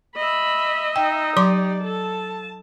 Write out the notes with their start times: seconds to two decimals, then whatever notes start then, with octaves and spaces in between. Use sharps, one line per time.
0.16 D#5 E5 B5
0.96 D#4 G5
1.37 F#3 G4 D5 C6 D6
1.83 A4 A5